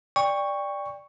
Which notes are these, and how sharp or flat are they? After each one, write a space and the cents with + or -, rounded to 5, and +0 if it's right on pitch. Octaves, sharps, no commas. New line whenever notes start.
D5 +0 G5 +25 C#6 +0